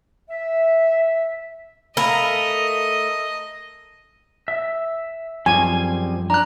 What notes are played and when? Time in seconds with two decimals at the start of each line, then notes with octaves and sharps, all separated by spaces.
0.30 E5
1.97 A3 A#4 D#5 F5 A#5 B5
4.48 E5
5.46 F#2 F3 G3 C4 G#4 G#5
6.30 D4 A#5 F#6